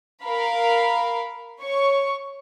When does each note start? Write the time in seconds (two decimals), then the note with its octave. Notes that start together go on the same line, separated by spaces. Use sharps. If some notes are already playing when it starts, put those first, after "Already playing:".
0.24 A#4 F5 B5
1.60 C#5 C#6